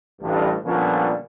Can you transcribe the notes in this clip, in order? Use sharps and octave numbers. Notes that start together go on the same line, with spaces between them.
A1 G2
A#2 D3 F3 G3 B3 C#4